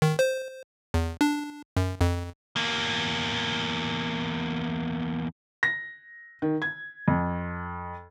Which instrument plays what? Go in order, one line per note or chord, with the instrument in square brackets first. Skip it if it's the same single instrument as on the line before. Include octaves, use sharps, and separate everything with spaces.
[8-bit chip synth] D#3
C5
E2
D4
F#2
F2
[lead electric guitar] E2 A#3
[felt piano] A#6
D#3
G#6
F2